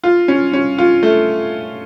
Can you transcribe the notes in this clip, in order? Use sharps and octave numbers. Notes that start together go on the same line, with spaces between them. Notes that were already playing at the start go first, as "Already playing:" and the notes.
F4
C#4
C#4
F4
A3